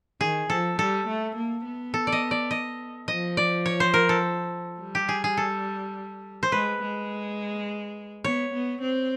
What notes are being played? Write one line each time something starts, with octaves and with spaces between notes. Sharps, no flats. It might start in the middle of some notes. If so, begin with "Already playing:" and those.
D#3 G#4
F3 A4
G3 A4
A3
A#3
B3
A4
D5
D#5
D5
D#5
F3 D#5
D5
C#5
C5
A#4
A4
G3
G4
G#4
G#4
A4
C5
G#3 B4
G#3
B3 C#5
B3
C4